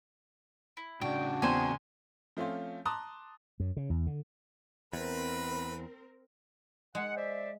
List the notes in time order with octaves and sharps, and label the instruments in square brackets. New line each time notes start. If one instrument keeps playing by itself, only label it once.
[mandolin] E4
[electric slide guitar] A2 C#3 C#4 [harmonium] D4 F#4 [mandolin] G5
[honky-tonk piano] E2 C4 [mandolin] G#4 C5 G#5
[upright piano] F3 A3 C4 C#4 F4
A5 A#5 C6 D6 D#6 F#6
[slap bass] F#2
C#3
E2
D3
[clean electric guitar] E2 [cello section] C4 A#4 [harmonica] B4 B5
[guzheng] G#3 [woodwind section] F#5
[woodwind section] C5 D5 E5